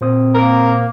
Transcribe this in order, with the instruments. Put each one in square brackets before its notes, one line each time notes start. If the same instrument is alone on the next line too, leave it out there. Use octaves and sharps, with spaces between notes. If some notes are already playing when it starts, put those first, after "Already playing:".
[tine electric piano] A#2 C5 D#6 [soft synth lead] C4
[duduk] A#3 [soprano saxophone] A#4